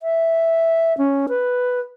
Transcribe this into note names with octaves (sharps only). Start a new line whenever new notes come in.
E5
C#4
B4